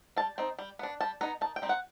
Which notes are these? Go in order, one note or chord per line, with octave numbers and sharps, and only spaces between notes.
G3 A5
C4 D#4
G3
B3 D4
G3 A5
B3 D#4 A#5
D#3 A5
G5
G3 C4 D#4
F#5